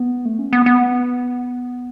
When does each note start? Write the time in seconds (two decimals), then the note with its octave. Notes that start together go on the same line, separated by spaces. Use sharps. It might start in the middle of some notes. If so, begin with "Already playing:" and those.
Already playing: B3
0.25 A3
0.39 C#4
0.53 B3
0.66 B3